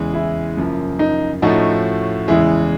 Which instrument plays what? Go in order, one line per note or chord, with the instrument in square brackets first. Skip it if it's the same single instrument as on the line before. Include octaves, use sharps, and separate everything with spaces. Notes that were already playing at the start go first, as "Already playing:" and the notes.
Already playing: [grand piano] E2 C#3 E3 G#3
[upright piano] E4
[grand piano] F#2 C#3 F3 A#3
[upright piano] D#4
[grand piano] A2 F3 A3 C#4 F#4 [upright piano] D#4
[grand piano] E2 C#3 E3 G#3 [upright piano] E4